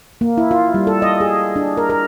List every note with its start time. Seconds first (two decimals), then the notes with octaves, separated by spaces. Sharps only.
0.21 A#3
0.38 E4
0.51 F4
0.74 G3
0.87 A4
1.02 D#5
1.20 G#4
1.56 D4
1.77 A#4
1.90 A#4